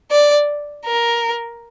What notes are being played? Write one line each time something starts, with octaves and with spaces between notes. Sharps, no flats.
D5
A#4